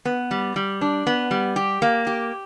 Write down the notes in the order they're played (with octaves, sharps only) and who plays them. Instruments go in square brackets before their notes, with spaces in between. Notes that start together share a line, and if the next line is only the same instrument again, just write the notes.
[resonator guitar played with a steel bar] B3
G3
G3
D4
B3
G3
G4
A#3
G4